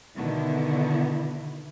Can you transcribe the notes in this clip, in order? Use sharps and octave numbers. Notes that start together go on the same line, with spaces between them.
B2 D3 D#3 B3 E4